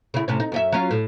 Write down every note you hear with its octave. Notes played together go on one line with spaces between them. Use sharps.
C#3 E4
A2 C3 C#4
D#4
F#2 C#4 E5
F#3 C#4 F4
A2